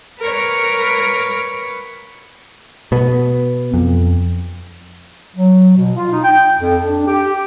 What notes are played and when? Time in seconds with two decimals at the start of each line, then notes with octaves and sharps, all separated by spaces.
0.20 A#4 B4 C#5
2.92 B2 B3
3.74 F2
5.36 F#3
5.76 B2
5.96 F4
6.12 D#4
6.24 G5
6.59 F2
6.84 D4
7.07 G4